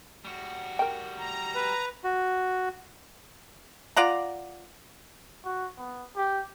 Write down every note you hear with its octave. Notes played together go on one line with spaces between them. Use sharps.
G3 F#4
A#4 G5
A#5
B4
F#4
F4 D5 F#5 A#5
F#4
B3
G4